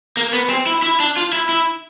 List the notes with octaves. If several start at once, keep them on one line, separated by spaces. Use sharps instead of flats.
A#3
B3
C4
E4
E4
D4
F4
E4
E4